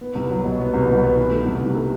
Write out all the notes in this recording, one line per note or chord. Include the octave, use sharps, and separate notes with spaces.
B3
C2
F#3
B2
B3
C2
B2
B3
E3
A3
C2
C3
A3